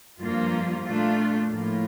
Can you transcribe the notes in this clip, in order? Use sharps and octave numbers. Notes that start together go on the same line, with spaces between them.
G2 F3 A#3 F4
A#2 A3 D4 F4
A2 F3 A#3 F4